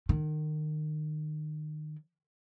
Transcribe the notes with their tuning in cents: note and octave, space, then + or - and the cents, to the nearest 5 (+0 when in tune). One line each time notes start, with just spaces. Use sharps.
D#3 -30